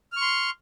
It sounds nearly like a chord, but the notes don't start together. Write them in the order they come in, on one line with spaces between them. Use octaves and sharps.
F6 C#6 C6